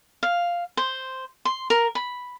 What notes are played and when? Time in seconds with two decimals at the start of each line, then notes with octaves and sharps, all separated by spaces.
0.23 F5
0.77 C5
1.45 C6
1.70 A#4
1.95 B5